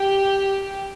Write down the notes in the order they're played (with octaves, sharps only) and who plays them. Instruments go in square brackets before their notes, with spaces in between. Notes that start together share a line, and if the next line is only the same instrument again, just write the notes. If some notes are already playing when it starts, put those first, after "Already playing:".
Already playing: [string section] G4